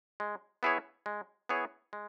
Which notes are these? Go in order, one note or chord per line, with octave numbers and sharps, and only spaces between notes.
G#3
B3 E4 G#4 C#5
G#3
B3 E4 G#4 C#5
G#3